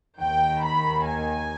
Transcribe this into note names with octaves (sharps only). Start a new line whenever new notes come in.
D#2 D#3 G5
B5
G#5